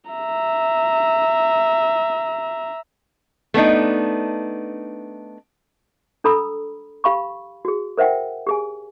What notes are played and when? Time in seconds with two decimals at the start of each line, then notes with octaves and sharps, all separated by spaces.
0.11 E5 A#5
3.54 A3 B3 D4 D#4
6.24 D4 A4 A#5 B5 D#6 E6
7.04 G4 F5 B5 C#6
7.65 F#4 G#4
7.97 A#4 C5 E5 F#5 G5
8.47 G4 G#4 G#5